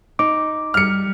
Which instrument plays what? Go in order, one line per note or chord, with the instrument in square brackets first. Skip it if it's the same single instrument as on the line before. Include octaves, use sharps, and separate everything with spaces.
[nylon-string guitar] D#4 [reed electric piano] D6
[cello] G3 [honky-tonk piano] F6 C#7